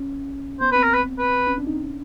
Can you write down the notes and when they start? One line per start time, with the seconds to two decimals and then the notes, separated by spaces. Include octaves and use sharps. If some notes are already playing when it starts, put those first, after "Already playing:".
Already playing: C#4
0.61 B3 C5
0.72 C4 B4
0.83 A#4
0.94 B4
1.19 B4
1.47 C#4
1.58 D4
1.67 D#4
1.76 D4
1.84 C#4